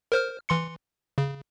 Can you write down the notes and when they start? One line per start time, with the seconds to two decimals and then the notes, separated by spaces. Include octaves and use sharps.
0.12 A#4 C5 F6
0.49 E3 C6 C#7
1.18 C#3